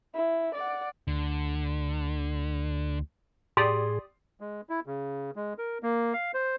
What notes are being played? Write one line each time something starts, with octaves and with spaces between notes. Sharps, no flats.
E4
D5 F#5
D2 D3
A2 G4 G#4 D5 C6 D#6
G#3
E4
C#3
G#3
A#4
A#3
F5
C5